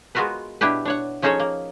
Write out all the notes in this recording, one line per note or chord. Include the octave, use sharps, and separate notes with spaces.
G#3 B3 F4 F#4 A#4 B4
B2 D4 E4 G4 B4
D4 C#5 F#5
F3 C#4 D#4 G#4 A4 C#5
A#3